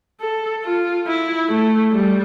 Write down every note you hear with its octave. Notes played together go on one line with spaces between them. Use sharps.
A4
F4
E4
A3
G3